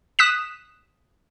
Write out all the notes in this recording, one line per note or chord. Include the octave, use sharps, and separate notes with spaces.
D#6 F#6 B6 E7